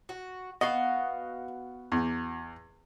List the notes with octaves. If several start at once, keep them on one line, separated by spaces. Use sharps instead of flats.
F#4
B3 F#4 D#5 F5
E2